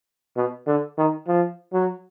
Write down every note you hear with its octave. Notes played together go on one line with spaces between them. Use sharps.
B2
D3
D#3
F3
F#3